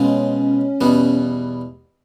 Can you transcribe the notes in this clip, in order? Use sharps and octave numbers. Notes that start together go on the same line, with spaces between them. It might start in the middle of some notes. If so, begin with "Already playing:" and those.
Already playing: B2 G#3 C4 C#4 F4
E2 B2 G3 B3